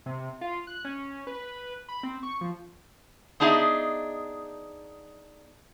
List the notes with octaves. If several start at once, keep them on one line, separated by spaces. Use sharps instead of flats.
C3
F4
F#6
C#4
B4
B5
C4
C#6
F3
B3 D4 D#4 G#4 D#5 E5